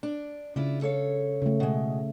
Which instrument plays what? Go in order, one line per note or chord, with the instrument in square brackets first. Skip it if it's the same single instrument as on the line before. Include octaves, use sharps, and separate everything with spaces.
[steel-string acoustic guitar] D4
[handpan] C#3 [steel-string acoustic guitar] D4 E4 F4
[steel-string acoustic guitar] A4 C#5 F5
[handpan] C#3 A3
[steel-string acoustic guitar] B2 G#3